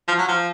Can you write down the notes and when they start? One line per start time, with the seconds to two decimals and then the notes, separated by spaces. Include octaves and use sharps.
0.08 F3
0.18 F#3
0.28 F3